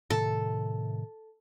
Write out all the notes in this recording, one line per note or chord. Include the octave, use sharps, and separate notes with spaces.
A2 C3 D#3 A4